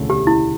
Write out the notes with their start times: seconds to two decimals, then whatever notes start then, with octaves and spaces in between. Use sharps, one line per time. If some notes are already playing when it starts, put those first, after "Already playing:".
Already playing: E1 D2 C#3 E3 A3
0.10 G4
0.27 E4